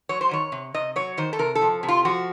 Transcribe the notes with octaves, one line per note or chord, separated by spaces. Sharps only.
F#3 C#5
C5
D#3 C#5
C3
C3 D#5
F#3 C#5
D#3 C5
A4
C3 A#4
A4
F3
C3
F4
F3 F#4